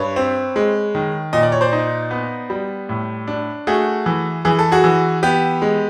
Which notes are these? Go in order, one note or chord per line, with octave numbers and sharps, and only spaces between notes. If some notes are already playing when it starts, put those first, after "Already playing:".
Already playing: G2 B4 C#5
C4
G#3
D#3
A#2 D#5
D5
C#5
C5 D5
D#4
B3
G3
A2
D4
A3 F#4 G#4
E3
E3 G#4
A4
F#4 G#4
E3
B3 G4
G#3